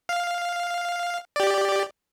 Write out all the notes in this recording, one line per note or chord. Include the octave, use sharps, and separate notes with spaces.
F5
G4 D5